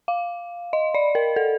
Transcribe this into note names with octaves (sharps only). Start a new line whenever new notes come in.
F5
D#5
D5
A#4
A4